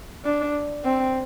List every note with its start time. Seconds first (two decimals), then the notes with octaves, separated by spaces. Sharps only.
0.25 D4
0.85 C4